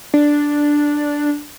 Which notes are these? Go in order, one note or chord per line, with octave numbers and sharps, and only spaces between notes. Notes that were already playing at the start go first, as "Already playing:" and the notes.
D4